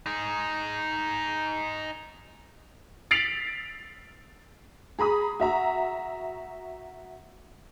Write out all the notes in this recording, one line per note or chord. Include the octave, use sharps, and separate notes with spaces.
D#4 G#4
A6 B6 C7 D7 F7 F#7
G#4 A#5 B5 D#6
F#4 E5 A#5